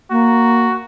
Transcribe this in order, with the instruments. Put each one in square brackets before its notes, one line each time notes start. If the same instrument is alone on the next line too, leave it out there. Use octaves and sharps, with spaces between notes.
[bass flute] A#3 [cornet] F#4